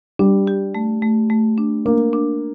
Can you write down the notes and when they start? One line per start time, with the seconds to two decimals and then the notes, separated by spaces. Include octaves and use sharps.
0.19 G3 D4
0.47 G4
0.75 A3
1.02 A3
1.30 A3
1.58 D4
1.85 A#3 D4
2.13 D4